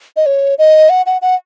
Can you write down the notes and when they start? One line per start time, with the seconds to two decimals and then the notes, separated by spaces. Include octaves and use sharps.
0.17 D#5
0.26 C#5
0.58 D#5
0.90 F#5
1.06 F#5
1.22 F#5